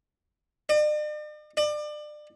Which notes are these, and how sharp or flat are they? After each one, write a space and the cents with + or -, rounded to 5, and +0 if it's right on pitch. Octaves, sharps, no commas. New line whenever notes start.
D5 +45
D5 +30